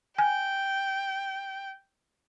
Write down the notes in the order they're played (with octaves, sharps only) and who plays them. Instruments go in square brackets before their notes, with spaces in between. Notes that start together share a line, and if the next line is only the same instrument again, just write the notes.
[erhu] G5 [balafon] G#5